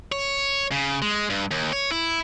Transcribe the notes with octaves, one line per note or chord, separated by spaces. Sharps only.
C#5
C#3
G#3
G2
D#2
C#5
E4